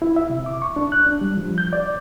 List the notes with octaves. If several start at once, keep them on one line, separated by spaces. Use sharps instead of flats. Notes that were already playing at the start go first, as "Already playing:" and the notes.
E4
E5
C3
D6
C#6
D4
F#6
D4
G3
F3
G6
D5